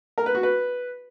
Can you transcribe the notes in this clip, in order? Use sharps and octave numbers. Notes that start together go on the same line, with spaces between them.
A#4
B4
F#4
B4